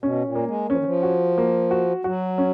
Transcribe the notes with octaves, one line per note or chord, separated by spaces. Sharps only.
B2 C#4
A#2
A#3
G#3
F3 C#4
D#3
F3
F#4
A#3
F#4
F#3 F#4
C#4